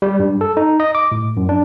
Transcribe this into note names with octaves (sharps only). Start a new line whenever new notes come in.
G3
G2
A4
D#4
D#5
D6
A2
F#2
D4